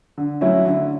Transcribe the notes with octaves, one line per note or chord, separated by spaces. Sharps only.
D3
F#3 A3 C#4 E4
D3